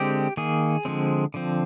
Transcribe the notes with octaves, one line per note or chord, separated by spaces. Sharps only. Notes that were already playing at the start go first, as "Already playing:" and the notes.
Already playing: D3 G#3 C4 G4
D#3 A#3 G#4
D3 F3 G#3 C4
D3 F3 C4